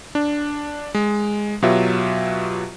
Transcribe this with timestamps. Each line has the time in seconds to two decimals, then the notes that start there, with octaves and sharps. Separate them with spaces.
0.15 D4
0.94 G#3
1.62 B2 F#3 F4 G4 B4 E5